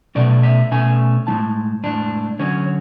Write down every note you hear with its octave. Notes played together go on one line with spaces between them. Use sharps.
B2 A3 C#4 D5
E5
B2 A3 C#4 G#5
A2 G#3 D4 A5
A2 G#3 D4
D3 F#3 C#4 C#5